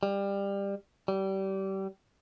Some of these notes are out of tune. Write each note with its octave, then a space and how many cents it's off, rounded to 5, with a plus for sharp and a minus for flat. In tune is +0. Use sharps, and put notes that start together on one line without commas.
G3 +20
G3 -25